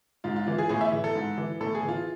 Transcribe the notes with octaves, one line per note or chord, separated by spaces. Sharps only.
G#2 F4
F4
E3 F4
G#4
A2 G#4
E5
E3
A4
G#2
E3
A2 A4
G#4
E3
F4